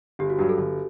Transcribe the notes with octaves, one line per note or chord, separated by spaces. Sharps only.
G1 G4
F#4
G2 F#3 G4
A4
G1